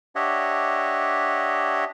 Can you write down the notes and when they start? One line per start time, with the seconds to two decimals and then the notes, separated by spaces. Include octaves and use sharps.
0.16 D4 G4 C#5 D#5 E5 F#5